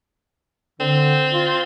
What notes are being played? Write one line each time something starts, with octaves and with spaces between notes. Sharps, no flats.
D3 C4
F4